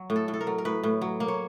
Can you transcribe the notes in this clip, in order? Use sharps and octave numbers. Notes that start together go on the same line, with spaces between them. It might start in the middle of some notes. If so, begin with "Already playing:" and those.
Already playing: F#3
A2
A4
A2
A4
A#4
F#3
A#4
A2 B4
A2
F#3
A#3
C#5